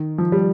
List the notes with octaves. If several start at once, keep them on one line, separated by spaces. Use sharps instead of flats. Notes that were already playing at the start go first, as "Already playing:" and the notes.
Already playing: D#3
F3
G3